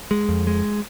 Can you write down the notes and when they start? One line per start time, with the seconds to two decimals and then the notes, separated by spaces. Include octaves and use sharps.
0.11 G#3
0.29 F2
0.47 G#3